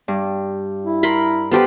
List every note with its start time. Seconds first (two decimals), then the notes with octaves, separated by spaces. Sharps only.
0.08 G2
0.85 E4
1.03 A#4 B5 C6
1.51 B3 F4 G4 A4 B4 C5